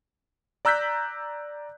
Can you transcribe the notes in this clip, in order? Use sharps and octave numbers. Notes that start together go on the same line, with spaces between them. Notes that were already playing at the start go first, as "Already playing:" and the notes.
D5 A#5 E6 F#6 G6 B6